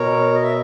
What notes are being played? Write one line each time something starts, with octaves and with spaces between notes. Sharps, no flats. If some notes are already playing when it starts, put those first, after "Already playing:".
Already playing: B2 A#4 C#5
D#5
E5